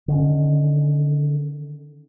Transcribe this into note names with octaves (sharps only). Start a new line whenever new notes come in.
D3 D#3 C#4